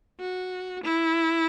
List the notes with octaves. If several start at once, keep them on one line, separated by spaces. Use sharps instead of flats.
F#4
E4